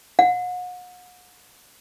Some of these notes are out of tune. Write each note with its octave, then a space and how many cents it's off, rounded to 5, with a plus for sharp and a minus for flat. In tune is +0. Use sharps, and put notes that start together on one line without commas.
F#5 -40